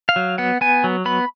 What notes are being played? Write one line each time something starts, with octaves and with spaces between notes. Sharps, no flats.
F5
F#3
B3 F#5
B3 G#5
F#3
B3 B5